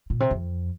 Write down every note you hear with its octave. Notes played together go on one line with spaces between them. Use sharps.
A#2
C3
F2